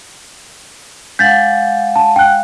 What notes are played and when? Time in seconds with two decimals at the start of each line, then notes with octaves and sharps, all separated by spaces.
1.19 G#3 F5 F#5 G6 A6
1.96 A5
2.16 G5 F#6